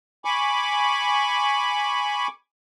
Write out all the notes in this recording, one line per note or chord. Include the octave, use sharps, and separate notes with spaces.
G#5 B5 C#6 D6